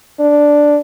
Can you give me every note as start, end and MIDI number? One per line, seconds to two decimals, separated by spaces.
0.20 0.78 62